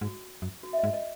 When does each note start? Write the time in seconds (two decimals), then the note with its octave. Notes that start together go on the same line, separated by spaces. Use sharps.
0.01 G#2 F#4
0.42 F#2
0.63 F#4
0.73 E5
0.78 D#5
0.84 G#2
0.93 D#5